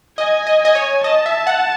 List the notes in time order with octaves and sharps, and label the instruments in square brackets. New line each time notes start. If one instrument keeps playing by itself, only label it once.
[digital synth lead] D#5 [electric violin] G#5
[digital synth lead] D#5
[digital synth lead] D#5 [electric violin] G#5
[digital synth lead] C#5
[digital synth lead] D#5 [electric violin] A5
[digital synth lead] E5
F#5